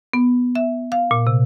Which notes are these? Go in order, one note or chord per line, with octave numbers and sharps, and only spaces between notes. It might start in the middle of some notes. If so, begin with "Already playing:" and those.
B3
E5
F5
A#2
C3